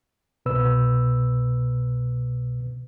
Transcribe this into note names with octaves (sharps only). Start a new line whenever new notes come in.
C2 B2 B4 E6